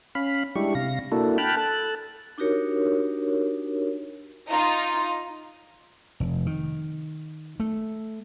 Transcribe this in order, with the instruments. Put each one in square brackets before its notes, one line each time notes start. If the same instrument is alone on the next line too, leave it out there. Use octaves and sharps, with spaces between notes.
[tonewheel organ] C#4 F5 B5
G3 G#3 D4 E4 G4 C#6
C3 F5 A#6
A#3 D4 E4 F#4 A4
G5 A5 B5 F6 F#6
A4 A5 F#6
[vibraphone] D4 D#4 F#4 G4 A#4 C#5
[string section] D#4 F4
[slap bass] F1
D#3
A3